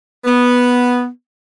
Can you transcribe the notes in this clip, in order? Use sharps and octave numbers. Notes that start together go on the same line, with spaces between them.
B3